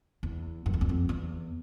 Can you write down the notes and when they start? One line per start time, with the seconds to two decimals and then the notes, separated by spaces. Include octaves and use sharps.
0.23 E2
0.66 F#2
0.73 F2
0.81 E2
0.89 F2
1.09 E2